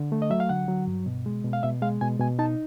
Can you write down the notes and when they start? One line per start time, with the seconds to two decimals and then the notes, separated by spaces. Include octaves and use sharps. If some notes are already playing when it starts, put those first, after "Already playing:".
Already playing: D3
0.12 A3
0.22 D#5
0.30 F#3 E5
0.40 F5
0.49 D3 F#5
0.68 F#3
0.87 G2
1.06 B2
1.26 G#3
1.44 B2
1.53 F5
1.63 B2 E5
1.82 G#3 F5
2.01 B2 G#5
2.20 B2 G#5
2.39 D#4 A5